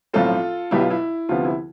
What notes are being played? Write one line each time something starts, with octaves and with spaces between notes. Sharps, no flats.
B1 A2 F3 C4 F4 A4
B1 B2 B3 E4 G4
F4
E4
D2 C3 F3 B3 F4
E4